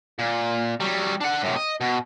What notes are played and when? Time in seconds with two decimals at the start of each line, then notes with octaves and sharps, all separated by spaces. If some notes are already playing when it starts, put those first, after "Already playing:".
0.19 A#2
0.80 F#3 G3
1.21 D4 F#5
1.44 F#2 C3
1.57 D#5
1.80 B2